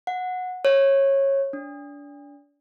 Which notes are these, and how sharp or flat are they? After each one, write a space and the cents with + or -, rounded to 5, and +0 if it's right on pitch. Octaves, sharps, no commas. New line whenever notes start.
F#5 -15
C#5 -20
D4 -30